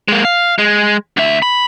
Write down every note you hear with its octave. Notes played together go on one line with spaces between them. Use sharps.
G#3 A#3
F5
G#3
D2 E5
B5